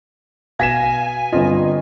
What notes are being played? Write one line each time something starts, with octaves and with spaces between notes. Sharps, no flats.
B2 F5 G#5 G#6 A#6 B6 E7
G1 C4 F4 D#5